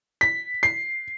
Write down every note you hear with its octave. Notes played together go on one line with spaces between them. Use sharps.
B6
C7